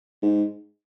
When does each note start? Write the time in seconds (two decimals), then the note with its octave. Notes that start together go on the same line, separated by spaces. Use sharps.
0.23 G#2